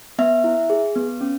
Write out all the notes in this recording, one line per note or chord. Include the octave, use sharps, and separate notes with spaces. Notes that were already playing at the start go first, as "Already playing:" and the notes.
B3 E5
E4
G#4
B3
C#4